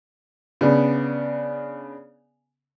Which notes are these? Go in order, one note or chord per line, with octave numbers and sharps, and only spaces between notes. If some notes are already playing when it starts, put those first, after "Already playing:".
C#3 B3 D4